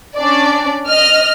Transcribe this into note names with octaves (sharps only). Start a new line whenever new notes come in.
C#4 D4 D5
D#5 F6